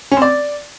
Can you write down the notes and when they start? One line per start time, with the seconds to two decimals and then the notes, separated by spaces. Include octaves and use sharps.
0.12 C#4
0.17 C4
0.22 D5